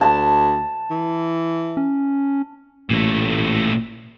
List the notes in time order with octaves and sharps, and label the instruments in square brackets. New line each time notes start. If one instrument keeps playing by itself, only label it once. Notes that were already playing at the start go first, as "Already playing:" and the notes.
[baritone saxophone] D2 [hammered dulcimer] A5
[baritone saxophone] E3
[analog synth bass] C#4
[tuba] A1 [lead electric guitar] A#2 A3